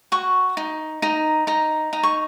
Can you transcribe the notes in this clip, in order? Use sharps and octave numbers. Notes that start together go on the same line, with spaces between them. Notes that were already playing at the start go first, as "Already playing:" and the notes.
F#4 C#6
D#4
D#4 A#5
D#4 A#5
D#4 A#5
C#6